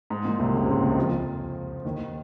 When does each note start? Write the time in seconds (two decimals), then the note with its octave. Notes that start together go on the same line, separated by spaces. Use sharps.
0.10 G#2
0.25 A#2
0.39 C2 C3
0.54 C#2 C#3
0.64 C3
0.68 C#2 C#3
0.82 D#2 D#3
0.97 F2 F3
1.85 D#2 D#3